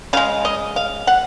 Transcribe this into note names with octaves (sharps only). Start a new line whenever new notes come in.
C#3 G#3 F5
D#5
F5
F#5